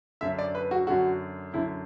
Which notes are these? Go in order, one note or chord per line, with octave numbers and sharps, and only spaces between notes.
F#2 D3 E5
D5
B4
F#4
F#2 D3 F#4
F#2 D3 E4